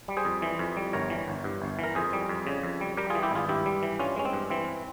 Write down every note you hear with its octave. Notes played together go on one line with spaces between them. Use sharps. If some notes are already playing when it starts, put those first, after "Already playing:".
G3
G#4 C5
F2
E3
F2
G3
G1 A#4 C#5
E3
G1
G2
G1
E3 A#4
F2 G#4 C5
G3
F2
C#3
F2
G3
G3 G4 A#4
F4 G#4
E3
E4 G4
G#1 F4 G#4
G2 E4 G4
G3
E3
G2 C#4 F4
G#3 C#4
C4
G2
E3 C4